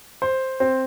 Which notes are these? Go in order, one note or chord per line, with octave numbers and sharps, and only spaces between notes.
C5
C4